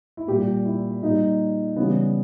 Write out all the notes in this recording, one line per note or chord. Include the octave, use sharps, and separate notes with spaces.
E4
A#2 G3 G4
E4
A#2 G3 D#4
C#3 E3 G3 B3